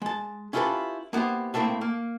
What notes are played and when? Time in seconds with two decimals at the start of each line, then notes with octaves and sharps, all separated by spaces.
0.02 G#3 A5
0.53 C#4 E4 F4 G4 A4 B4
1.13 A#3 B3 E4 G4 C5
1.54 A2 A3 A#3 C4 E4
1.81 A#3